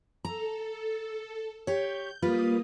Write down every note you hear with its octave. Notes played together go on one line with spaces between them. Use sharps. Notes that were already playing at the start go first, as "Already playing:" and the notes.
A4 A#5
G4 C#5 G6
G3 A#3 F4 B4 D#6